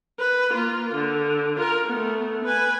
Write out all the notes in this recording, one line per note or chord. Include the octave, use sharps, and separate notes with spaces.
B4
A#3 F4
D3
F4 A#4
A3 B3
B4 G#5